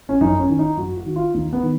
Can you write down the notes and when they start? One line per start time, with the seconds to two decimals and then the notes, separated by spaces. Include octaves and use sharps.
0.09 C#4
0.21 F#2 D#4
0.39 C#4
0.50 D#3
0.59 D#4
0.77 F#2 F#4
0.97 F#4
1.06 D#3
1.16 F4
1.34 D#2 D#4
1.53 B3
1.63 D#3